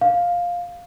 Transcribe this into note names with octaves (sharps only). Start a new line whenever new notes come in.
F5